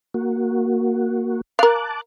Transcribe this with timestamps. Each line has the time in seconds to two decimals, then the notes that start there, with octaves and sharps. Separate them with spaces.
0.14 A#3 F#4
1.59 A#4 F5 A5 D6 F#6